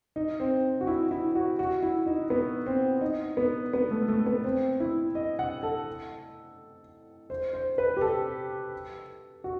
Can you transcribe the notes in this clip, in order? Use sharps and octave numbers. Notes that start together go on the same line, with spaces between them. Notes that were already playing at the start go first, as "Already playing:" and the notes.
D#4
C4
F#4
E4
E4
F#4
F#4
E4
D#4
B3
C4
D#4
B3
B3
A3
A3
B3
C4
E4
D#5
F#5
A4
C5
C5
B4
G4
A4
F#4